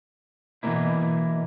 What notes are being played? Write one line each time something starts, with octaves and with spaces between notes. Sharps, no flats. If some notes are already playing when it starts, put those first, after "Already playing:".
B2 E3 F3 G#3 A#3 E4